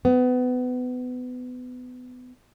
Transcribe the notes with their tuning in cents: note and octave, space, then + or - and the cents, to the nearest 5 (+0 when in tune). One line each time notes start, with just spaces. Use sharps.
B3 +25